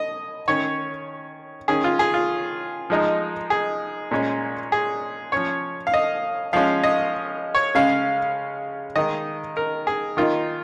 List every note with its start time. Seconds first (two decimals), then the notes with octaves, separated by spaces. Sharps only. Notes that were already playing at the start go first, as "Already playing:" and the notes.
Already playing: D#5
0.48 D#3 C#4 C#5
1.68 D#3 C#4 G#4
1.84 F4
1.99 G#4
2.14 F4
2.90 F3 G#3 D#4
3.50 G#4
4.11 A#2 G#3 C#4
4.72 G#4
5.32 F3 C#4 C#5
5.87 F5
5.94 D#5
6.53 F3 G#3 C#4 F5
6.84 D#5
7.55 C#5
7.75 C#3 G#3 C#4 F5
8.96 D#3 G#3 D#4 D#5
9.57 A#4
9.87 G#4
10.17 D#3 A#3 D#4 F4